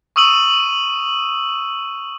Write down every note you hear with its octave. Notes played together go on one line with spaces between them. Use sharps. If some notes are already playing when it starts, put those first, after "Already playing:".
C#6 D#6 E6 D#7 F#7